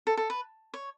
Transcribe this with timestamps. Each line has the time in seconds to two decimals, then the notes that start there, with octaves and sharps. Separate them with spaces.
0.07 A4
0.17 A4
0.30 B4
0.74 C#5